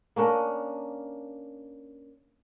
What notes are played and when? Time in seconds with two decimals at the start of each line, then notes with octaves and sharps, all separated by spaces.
0.16 A#3 C#4 D4 A#4